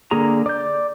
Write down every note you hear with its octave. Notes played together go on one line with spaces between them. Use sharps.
D3 A#3 G#4 A#4 A#5
D5 G6